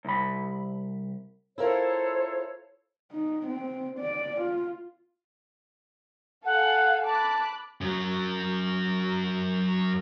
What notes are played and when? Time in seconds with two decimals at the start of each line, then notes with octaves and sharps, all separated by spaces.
0.05 C2 B5
1.58 E4 F4 A4 A#4 C5 C#5
3.11 D#4
3.47 C4
3.99 D5
4.40 F4
6.45 A4 F5 F#5 G#5
7.06 A5 B5 D6 F#6
7.81 F#2 F#3